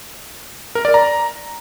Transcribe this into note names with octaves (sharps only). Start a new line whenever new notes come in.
A#4
D5
A#5